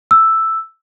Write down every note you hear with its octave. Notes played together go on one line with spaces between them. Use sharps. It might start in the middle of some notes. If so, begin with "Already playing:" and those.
E6